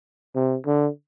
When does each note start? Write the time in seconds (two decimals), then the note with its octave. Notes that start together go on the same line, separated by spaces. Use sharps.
0.35 C3
0.66 D3